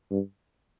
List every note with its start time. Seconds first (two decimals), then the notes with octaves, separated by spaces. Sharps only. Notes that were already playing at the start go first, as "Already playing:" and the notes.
0.11 G2